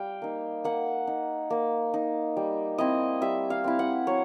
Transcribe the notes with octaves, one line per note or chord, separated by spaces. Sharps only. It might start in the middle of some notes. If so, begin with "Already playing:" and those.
Already playing: G3 F5 G5
A#3 D#4
A#3 F#5
D#4
A#3
D#4
G3
C4 E4 D#5
G3 E5
F5
C4 E4
F#5
F#3 C#5